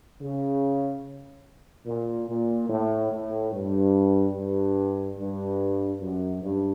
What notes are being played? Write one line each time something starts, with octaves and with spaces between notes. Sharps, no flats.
C#3
A#2
A#2
A2
A2
G2
G2
G2
F#2
G2